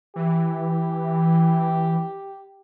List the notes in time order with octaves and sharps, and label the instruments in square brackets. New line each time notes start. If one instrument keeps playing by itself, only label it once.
[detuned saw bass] E3 [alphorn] G4